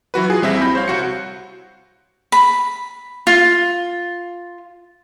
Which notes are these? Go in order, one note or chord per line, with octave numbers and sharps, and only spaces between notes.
E3 F#3 F#4 B4
F4 G#4
A#1 G3 C4 E4 E5 A#6
B5 G6
C5 C#5 F5
C2 F#4 C#7
B5
F4